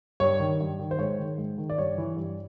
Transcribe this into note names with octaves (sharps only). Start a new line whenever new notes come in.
G2 C#5
D#3
G2
D#3
C5
G#2 C#5
D#3
G#2
D#3
D5
G2 C#5
E3
G2